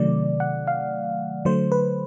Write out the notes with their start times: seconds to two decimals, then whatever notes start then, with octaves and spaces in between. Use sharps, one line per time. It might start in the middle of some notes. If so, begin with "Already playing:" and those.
Already playing: C3 D#3 F#3 A3 D5
0.40 F#5
0.67 F5
1.45 D3 F#3 A3 C5
1.72 B4